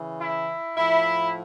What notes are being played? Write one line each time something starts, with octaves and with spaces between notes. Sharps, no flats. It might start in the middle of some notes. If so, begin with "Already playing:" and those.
Already playing: C#3 E3
E4
A2 F3 E4